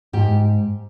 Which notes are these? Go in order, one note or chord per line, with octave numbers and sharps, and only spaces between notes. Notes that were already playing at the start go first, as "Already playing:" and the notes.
G#2 G4